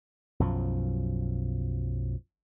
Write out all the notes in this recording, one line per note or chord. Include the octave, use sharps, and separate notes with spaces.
B1 F#2 F3